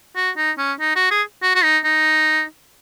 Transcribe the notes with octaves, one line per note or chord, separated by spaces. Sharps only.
F#4
D#4
C#4
D#4
F#4
G#4
F#4
F#4
D#4
D#4